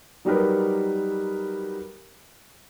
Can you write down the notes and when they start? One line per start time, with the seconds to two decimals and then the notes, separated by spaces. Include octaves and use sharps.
0.25 F#3 G3 D#4 G4 A#4 B4